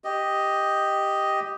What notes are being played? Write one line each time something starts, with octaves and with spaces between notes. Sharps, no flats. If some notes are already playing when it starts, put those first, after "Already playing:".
G4 D#5